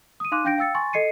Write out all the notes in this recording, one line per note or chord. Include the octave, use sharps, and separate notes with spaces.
D#6 D#7
D#4 F5 C6 D6 F#6 D#7
D4 F5 G5 G6 A#6 D7
F5 G5 E6 A6 C#7
G#5 C6 C#6 A6
A4 D#5 C7 C#7 D#7